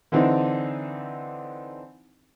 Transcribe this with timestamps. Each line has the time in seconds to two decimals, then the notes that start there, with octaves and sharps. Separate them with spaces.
0.12 D3 E3 C4 D4 D#4